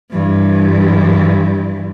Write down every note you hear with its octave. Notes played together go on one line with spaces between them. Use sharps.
G2 E3